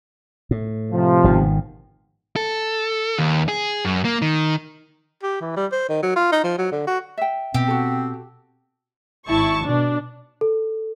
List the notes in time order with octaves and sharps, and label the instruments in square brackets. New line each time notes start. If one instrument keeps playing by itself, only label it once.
[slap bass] A2
[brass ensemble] C3 F3
[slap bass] G#1 B2 D#3
[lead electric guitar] A4
D#2
G#4
F#2
A#3
D#3
[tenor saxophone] G4
E3
G3
C5
D#3
F#3
F4
D#4
F3
F#3
D3
F#4
[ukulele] E5 G5
[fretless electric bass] B2 [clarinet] C4 [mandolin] G4
[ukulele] F#4 A4
[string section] G#1 E4 A5 C#6
B2 D4
[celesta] A4